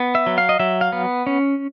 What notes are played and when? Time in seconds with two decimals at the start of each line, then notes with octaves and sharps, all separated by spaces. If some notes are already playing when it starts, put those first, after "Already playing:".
Already playing: B3
0.15 E5
0.26 F#3
0.38 F5
0.49 D#5
0.60 F#3 E5
0.81 F5
0.92 B3
1.27 C#4